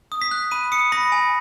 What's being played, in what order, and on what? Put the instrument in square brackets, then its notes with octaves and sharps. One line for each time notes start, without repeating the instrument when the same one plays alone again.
[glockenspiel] D#6
B6
F#6
B5 D#7
D#6 C#7
B5 A#6
G#5